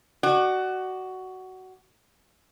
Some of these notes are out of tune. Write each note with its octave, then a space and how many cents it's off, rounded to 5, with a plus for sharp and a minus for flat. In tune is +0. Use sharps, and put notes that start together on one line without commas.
F#4 +15 D5 +30